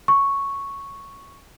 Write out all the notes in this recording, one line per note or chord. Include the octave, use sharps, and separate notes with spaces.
C#6